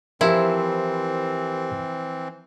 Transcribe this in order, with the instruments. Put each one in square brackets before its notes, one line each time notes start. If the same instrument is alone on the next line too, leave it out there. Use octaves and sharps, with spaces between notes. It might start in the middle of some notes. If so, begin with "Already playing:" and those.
[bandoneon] E3 C4 [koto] F3 E4 [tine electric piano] G4 A#4